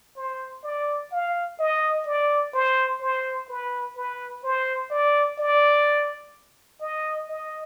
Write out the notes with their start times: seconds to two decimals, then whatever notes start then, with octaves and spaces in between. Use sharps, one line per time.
0.17 C5
0.64 D5
1.12 F5
1.59 D#5
2.06 D5
2.54 C5
3.01 C5
3.49 B4
3.96 B4
4.44 C5
4.91 D5
5.38 D5
6.81 D#5
7.28 D#5